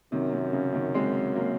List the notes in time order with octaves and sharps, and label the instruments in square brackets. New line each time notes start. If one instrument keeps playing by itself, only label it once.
[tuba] F#2 [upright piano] C3 D#3
[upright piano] C3
C#3
C#3
C3 D#3
G#3 C4
F#3 A#3